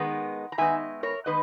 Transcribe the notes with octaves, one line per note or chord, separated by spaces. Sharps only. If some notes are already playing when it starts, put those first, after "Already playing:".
Already playing: D#3 G#3 B3 D#4
A#5
D#3 G#3 B3 D#4 E5 G#5
A#4 C#5
D#3 G#3 B3 D#4 B4 D#5